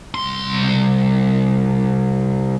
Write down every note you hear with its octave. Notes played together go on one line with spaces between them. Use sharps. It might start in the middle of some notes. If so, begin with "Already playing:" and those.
C2 C6